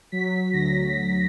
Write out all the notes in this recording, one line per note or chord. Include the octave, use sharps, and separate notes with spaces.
F#3 B6
D2 A#6